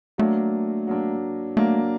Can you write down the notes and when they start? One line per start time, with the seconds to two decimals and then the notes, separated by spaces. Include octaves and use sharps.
0.18 F#3 A3 A#3 D4
0.87 F#3 A#3 D4
1.57 F#3 A3 A#3 D4